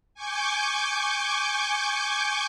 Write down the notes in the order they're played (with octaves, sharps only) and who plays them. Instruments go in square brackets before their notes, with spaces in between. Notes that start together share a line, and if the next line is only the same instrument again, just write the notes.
[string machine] G#5 C#6 D6 G6